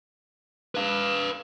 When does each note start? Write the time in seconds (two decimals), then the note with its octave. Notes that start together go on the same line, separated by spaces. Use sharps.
0.75 B4 F5